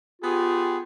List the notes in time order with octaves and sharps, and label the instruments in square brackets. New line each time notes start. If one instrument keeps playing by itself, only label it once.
[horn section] B3 G4 G#4 [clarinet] F4